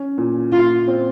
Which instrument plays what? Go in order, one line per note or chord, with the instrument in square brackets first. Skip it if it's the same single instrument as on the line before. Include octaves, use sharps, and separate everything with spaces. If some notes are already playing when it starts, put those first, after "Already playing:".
Already playing: [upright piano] C#4
A#2
[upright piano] A#2 [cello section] F4
[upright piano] C4